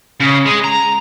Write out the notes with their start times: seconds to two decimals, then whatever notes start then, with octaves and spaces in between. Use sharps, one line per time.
0.20 C#3
0.46 G#3
0.64 A#5